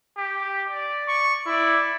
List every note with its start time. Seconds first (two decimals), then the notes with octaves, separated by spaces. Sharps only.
0.18 G4
0.69 D5
1.08 C#6
1.47 E4 D5